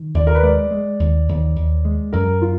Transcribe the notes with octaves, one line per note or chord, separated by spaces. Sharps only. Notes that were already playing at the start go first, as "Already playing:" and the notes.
Already playing: D#3
D#2 D5
A#4
B4
G#3 D5
G#3
D#2
D#2
D#2
G#3
F#2 A#4
F4